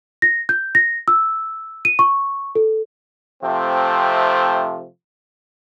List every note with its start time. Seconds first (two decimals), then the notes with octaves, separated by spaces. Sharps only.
0.22 A#6
0.49 G6
0.75 A#6
1.08 E6
1.85 D#7
1.99 C#6
2.55 A4
3.43 C3 F3 A3 C4